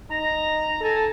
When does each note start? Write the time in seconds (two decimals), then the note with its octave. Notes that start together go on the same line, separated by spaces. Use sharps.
0.10 D#4 A#5
0.81 A4 G#5 A5